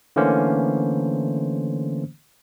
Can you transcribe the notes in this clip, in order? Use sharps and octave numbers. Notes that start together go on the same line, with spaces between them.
D3 E3 A3 A#3 C#4 C5